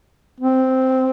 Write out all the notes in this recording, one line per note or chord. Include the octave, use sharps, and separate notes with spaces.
C4